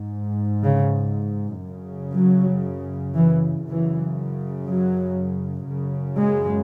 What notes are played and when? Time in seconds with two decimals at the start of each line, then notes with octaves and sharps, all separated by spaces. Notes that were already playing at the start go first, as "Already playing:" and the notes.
Already playing: G#2
0.63 C#3
1.63 F#2 C#3
2.13 F#3
3.15 E3
3.65 F#2 C#3 E3
4.66 F#3
5.66 F#2 C#3
6.17 G#3